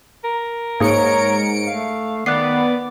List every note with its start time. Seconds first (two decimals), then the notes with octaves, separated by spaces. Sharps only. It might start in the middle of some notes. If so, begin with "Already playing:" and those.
0.24 A#4
0.80 G#2 A#3 D#4 G#4 C#5 C#7 D7
1.67 A3 F5
2.26 D#3 B3 D5 F#6 C7